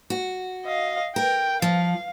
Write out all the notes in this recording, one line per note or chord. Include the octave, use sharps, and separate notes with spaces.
F#4
D#5 F5
A#4 G5
F3 F5